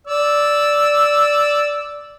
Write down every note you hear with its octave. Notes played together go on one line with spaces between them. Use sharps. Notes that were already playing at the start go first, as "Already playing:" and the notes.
D5 E6